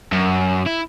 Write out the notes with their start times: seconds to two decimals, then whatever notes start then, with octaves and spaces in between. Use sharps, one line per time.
0.13 F#2
0.66 E4